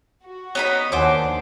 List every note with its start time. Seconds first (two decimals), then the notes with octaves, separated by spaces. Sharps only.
0.24 F#4
0.55 B3 D#4 C#5 B5
0.92 D#2 D4 C5 C#5 F#5 G#5 D6